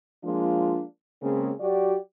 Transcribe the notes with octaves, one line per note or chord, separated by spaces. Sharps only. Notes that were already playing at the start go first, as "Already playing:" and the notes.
F3 G#3 A#3 D4 F4
C#3 G#3 A#3 C4 C#4
F#3 F#4 G4 D5